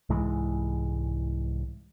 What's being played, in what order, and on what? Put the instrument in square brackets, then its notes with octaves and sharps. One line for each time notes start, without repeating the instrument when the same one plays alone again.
[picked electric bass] C2 G#2 E3 G#3